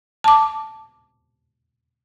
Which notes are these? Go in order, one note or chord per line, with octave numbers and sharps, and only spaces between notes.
A5 D6